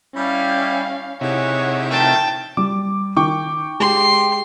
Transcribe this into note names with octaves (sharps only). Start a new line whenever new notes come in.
G3 C#4 E4 F5
C3 D#4 E4 G4 G#4 C#5 F#5
D#3 F3 A3 G5 A5
G3 D6
D#3 G5 C#6 D6
G#3 G4 C6